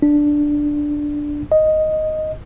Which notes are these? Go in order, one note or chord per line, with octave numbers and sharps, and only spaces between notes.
D4
D#5